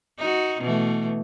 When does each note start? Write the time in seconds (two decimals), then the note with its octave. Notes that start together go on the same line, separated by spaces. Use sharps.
0.18 D#4 F#4
0.61 B2 E3 A3